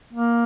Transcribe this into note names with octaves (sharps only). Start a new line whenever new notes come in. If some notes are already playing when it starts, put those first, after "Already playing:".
A#3